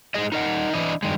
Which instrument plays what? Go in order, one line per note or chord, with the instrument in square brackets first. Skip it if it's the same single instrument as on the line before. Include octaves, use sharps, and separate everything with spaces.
[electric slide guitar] G#2 F3 G#4 D#5
D#4 A#4 D#5 F#5
E3 D4 E4 D#5
G2 D#3 G#3